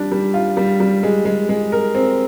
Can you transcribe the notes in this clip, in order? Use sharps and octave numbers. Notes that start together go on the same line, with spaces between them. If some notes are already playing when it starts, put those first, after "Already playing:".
Already playing: G3 D4
G3
F4
G3
G3
G#3
G#3
G#3
A#4
C4